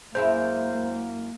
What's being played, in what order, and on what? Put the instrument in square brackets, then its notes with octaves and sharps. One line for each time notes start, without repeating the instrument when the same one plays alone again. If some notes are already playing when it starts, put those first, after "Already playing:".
[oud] F#2 G#3 E4 [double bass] A#3 [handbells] C5